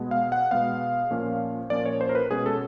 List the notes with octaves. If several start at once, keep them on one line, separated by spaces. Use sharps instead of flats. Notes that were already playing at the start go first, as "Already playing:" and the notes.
Already playing: B2 G#3 B3
F5
F#5
B2 G#3 B3 F5
A#2 F3 A#3 C#4
A#2 F3 A#3 C#4 D5
C#5
C5
A#4
B4
B2 G#3 C#4 G#4
A4